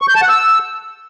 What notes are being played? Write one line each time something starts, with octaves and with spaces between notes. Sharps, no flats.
C#6
G6
A5
F#5
E6